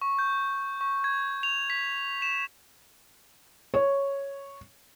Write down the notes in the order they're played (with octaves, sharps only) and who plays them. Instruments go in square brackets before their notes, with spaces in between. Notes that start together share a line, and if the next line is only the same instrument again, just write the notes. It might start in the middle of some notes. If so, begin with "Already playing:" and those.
[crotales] C#6
G6
C#6
G#6
F7
B6
E7
[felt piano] C#5